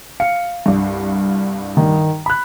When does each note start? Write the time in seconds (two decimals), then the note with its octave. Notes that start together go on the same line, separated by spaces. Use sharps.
0.20 F5 C#7
0.66 C2 G2
1.77 D#3
2.26 B5 F#6